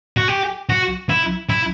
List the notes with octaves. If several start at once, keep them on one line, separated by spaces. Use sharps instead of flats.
F#4
G4
F#4
E4
E4